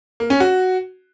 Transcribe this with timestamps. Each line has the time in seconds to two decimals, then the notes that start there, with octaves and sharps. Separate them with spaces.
0.20 A#3
0.30 C#4
0.40 F#4